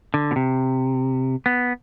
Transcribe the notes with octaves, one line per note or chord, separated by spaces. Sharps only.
D3
B2
C3
B3